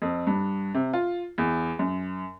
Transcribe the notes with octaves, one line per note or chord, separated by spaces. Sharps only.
F2
G2
C3
F4
E2
F#2